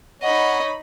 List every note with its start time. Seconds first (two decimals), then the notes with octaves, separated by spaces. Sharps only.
0.22 D#4 C#5 D#5 F#5 B5